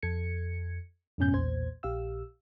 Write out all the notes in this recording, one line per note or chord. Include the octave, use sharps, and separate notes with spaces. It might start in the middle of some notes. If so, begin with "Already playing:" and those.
F2 A4 G#6 C#7
F2 G#2 B2 C#4 G#5 G6
B1 E2 A#2 C5 G#6
A#1 G4 F5 E6